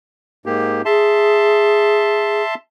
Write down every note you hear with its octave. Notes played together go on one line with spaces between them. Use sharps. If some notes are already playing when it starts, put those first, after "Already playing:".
G#2 A#3 G4
G#4 E5 A5 C6